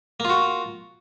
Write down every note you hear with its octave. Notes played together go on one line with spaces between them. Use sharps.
A#3 F4 F#4